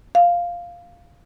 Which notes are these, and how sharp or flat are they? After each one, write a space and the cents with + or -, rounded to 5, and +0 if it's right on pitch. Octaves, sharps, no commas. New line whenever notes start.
F5 +0